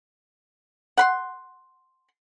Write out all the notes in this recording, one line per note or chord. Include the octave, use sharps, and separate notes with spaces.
F#5 B5 C6